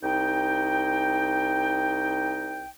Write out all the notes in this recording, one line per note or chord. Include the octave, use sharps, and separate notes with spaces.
C2 D#4 G5